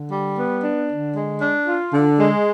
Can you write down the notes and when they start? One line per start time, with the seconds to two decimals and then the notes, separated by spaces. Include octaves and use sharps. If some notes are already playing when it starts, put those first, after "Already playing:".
Already playing: D3
0.12 G3
0.38 B3
0.64 D4
0.90 D3
1.15 G#3
1.42 D4
1.67 F4
1.93 D3
2.19 G#3